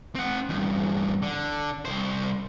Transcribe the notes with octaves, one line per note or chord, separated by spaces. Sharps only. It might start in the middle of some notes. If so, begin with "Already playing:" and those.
C4 F#5
E2 G2
D3
C2 C5